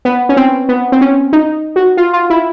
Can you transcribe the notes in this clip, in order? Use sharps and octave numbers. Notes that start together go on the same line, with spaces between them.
B3
C#4
C4
B3
C4
C#4
D#4
F#4
F4
F4
E4